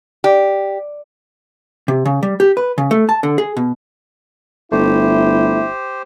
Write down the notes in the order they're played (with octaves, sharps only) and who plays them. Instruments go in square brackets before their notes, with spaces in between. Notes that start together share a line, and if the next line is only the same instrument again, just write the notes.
[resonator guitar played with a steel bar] G4 [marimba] D5
[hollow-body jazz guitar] C3
C#3
G3
G4
B4
C#3
A3
A5
D3
G#4
B2
[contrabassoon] G1 [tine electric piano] A3 [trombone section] E4 [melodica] G4 C5